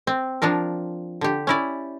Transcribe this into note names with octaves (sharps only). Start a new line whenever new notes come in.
C4
F3 D4 F4 A#4
D3 G4
C#4 E4 D5